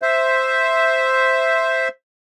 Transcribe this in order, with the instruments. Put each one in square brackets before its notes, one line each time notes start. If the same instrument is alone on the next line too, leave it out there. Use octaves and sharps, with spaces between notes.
[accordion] C5 E5